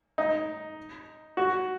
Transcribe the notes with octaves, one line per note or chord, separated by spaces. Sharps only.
D#4
F#4